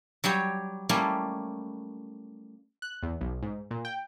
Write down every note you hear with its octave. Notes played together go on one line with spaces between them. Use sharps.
F#3 G3 G4 C#5
G3 A3 A#3 C#4 E4
F#6
E2
B1
G#2
A#2
G5